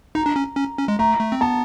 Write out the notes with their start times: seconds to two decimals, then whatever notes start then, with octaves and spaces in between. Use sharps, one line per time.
0.15 D#4 A#5
0.26 D4
0.36 C#4
0.57 C#4
0.78 C#4
0.88 G#3
0.99 A3 A#5
1.20 A3
1.32 C4
1.41 B3 A5